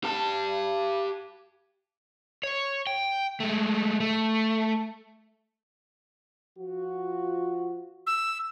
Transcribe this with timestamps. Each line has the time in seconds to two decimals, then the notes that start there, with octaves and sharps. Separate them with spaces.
0.04 G4 A5
2.43 C#5
2.87 G5
3.40 G#3 A3
4.00 A3
6.58 F3 F4 F#4
8.07 E6